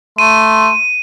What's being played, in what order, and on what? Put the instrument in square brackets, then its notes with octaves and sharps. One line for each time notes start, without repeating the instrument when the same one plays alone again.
[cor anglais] A3 [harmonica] C6 [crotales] D#7